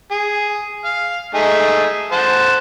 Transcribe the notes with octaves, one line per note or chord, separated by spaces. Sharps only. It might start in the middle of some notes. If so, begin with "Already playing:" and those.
G#4
F5
A3 D#4 G#4
C5 F#5 A5